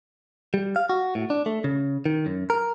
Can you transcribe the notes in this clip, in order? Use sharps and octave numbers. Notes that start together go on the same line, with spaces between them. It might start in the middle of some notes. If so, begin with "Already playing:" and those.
G3
F5
F#4
A2
D4
A3
C#3
D#3
F#2
A#4